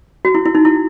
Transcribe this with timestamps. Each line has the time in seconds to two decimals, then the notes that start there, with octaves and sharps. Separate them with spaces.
0.25 F#4
0.35 E4
0.45 E4
0.55 D#4
0.65 E4